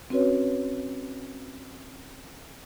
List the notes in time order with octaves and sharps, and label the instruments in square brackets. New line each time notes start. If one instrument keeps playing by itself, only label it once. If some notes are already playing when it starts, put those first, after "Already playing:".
[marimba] C4 C#4 F#4 B4 C#5